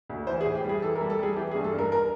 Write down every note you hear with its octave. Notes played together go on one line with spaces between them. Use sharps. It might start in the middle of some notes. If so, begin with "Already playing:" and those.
D2
E3 C5
G#4
A2
G4
G3 G#4
E3 A4
A#4
G3
A4
G3 G#4
E3 G4
G#4
G2
A4
G2 A#4
A#4